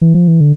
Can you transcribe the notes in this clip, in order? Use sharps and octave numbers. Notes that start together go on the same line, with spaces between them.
E3
F3
E3
D3